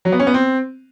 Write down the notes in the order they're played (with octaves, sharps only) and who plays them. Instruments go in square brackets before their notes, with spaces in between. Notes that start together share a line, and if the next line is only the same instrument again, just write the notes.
[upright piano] F#3
B3
C#4
B3
C4